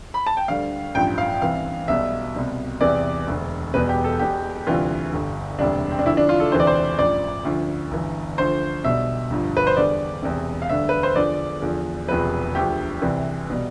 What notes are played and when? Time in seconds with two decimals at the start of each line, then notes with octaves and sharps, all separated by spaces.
0.14 B5
0.27 A5
0.37 G5
0.48 D2 D3 G3 F5
0.95 A1 G2 F3 G5
1.18 F5
1.42 C2 C3 E3 F5
1.88 B1 B2 G3 E5
2.35 C2 B2 G3
2.81 E2 C3 E3 G3 D5
3.27 E1 D2 D3
3.73 E1 E2 B2 G3 B4
3.89 G4
4.04 A4
4.19 E1 E2 B2 G4
4.67 D2 C3 E3 G3 F4
5.13 G1 G2 D3
5.59 E1 D2 C3 G3 D4
5.91 C4
5.99 D4
6.05 D2 D3 F3 E4
6.17 D4
6.29 F4
6.40 A4
6.52 E1 D2 C3 E3 C5
6.60 D5
6.67 C5
6.98 A1 G2 F3 D5
7.45 D2 D3 F3
7.91 G1 G2 E3
8.38 D2 D3 F3 C5
8.84 B1 B2 G3 E5
9.30 G1 G2 F3
9.57 B4
9.67 C5
9.77 E2 D3 G3 D5
10.22 E1 E2 C3
10.62 F5
10.69 D2 D3 G3 E5
10.89 B4
11.03 C5
11.16 E2 D3 F3 D5
11.62 E2 D3 F3
12.08 E1 E2 C3 F3 B4
12.55 D2 D3 F3 G4
13.01 C2 C3 E3 G3
13.50 B2 G3